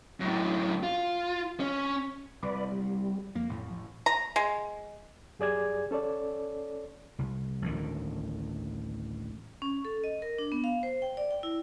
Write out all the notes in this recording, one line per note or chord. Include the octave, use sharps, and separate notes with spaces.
F#2 A2
F4
C#4
C2 B4 D5
G3
F2 A#3
A1 A2
A#5
G#3
F#2 G4 G#4 D5 G#5 G#6
C#4 A4 C#5 D5
C2
A1 D2 D#3
C#4
A4
D#5
A#4
D4
B3
F5
C5
G5
D5
G5
E4